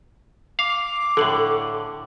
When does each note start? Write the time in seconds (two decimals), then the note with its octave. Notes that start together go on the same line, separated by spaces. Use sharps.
0.59 F5 D6
1.17 A2 D3 A4 F#7